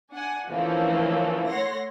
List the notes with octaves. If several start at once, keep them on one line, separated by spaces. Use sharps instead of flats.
D4 F#5 G#5
D3 E3 F3 A3 A#3 C#4
A3 C#5 F#5 C6 A#6